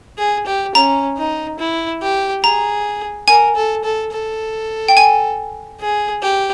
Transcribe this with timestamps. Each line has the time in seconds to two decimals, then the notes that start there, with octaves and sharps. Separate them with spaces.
0.18 G#4
0.46 G4
0.75 C#4 A#5
1.17 D#4
1.59 E4
2.02 G4
2.44 G#4 A#5
3.28 A#4 G#5
3.56 A4
3.84 A4
4.12 A4
4.88 G5
4.97 G#5
5.80 G#4
6.22 G4